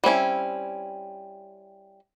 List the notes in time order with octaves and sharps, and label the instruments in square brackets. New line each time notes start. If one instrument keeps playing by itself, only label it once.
[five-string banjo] G3 C4 C#4 E4